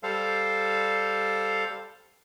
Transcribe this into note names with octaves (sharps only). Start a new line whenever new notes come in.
G3 A4 C5 F5